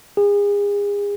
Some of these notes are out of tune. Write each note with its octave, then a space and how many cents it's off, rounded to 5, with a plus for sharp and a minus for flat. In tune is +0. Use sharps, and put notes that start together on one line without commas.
G#4 -35